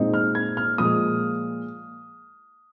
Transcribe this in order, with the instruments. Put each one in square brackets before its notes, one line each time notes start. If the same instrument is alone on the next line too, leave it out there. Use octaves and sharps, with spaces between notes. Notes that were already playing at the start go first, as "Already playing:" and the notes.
Already playing: [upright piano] A#2 G#3 C4 D#4
F6
G#6
F6
A#2 F3 G#3 D#6